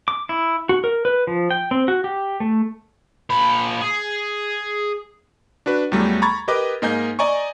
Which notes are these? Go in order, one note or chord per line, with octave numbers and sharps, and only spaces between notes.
D6
E4
F#4
A#4
B4
F3
G5
C4
F#4
G4
A3
A#2 B5
G#4
D4 F#4 B4
E2 F#3 G3 A3
A#5 B5 C#6 G#6 A6
G4 A#4 B4 D#5 D6
G#2 A#3 D#5 G#5 G6
D5 D#5 G#5 A#5 C#6